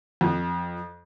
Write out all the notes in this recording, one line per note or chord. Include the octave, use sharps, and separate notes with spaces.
F2